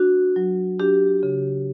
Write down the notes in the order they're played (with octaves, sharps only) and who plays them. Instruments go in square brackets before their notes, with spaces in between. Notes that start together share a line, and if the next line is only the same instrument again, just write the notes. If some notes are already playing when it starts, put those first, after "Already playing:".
Already playing: [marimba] D4 F#4
F#3
D4 G4
C#3